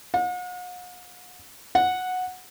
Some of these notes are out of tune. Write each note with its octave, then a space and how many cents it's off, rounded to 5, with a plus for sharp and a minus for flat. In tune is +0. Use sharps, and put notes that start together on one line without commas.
F#5 -45
F#5 -10